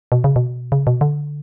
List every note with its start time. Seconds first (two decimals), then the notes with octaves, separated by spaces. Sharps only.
0.12 B2
0.24 C#3
0.36 B2
0.72 C#3
0.87 B2
1.01 D3